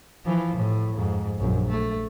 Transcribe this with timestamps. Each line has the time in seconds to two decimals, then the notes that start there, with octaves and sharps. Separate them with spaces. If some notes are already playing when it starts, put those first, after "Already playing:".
0.25 E3 F3
0.56 A2
0.96 F2 G#2
1.39 A#1 F#2
1.70 A3